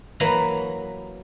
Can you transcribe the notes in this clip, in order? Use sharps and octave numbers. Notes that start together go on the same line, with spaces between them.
E3 F#3 A#3 B4 A#5 B5